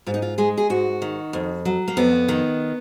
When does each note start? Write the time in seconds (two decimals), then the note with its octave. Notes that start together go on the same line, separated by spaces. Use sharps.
0.07 G#2 F4
0.14 D#4
0.22 F4
0.38 G#3 G#4
0.58 G#4
0.70 G#2 F#4
1.02 D#3
1.33 F2
1.65 F#3
1.88 A#3
1.97 F2 B3
2.28 D#3